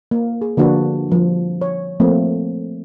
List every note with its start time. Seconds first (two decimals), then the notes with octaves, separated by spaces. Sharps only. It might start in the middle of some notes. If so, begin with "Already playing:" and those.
0.11 A#3
0.42 G#4
0.57 D3 F3 A#3 D4 F#4 B4
1.09 F3 G3
1.62 C#5
2.00 F3 A3 A#3 C4